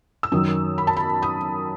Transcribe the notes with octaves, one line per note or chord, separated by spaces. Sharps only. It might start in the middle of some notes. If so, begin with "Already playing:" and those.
E6
F#2 D#3 F#3 D#6
B5
A5
B5
D#6